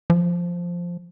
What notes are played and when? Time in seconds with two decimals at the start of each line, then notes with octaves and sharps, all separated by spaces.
0.10 F3